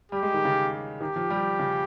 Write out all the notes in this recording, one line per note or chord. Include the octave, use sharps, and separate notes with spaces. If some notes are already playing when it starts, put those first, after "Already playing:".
G3 G4
G#3
D#3
C#3
D#3 G4
F3
G3
C#3